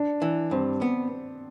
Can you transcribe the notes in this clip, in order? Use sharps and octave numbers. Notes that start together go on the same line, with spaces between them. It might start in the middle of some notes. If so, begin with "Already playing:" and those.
Already playing: D4
E3
G2 C4
B3